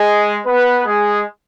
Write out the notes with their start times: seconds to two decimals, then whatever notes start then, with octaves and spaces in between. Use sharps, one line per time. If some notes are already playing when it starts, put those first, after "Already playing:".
Already playing: G#3 G#4
0.46 B3 B4
0.85 G#3 G#4